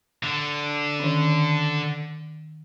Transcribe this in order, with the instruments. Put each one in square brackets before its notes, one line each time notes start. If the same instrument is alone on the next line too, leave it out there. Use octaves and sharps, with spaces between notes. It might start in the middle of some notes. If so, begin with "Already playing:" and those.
[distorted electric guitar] D3
[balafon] D#3 C#4